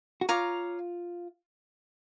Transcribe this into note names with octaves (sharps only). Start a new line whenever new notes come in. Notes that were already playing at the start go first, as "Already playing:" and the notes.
F#4
F4 C#5 F5 A#5 D6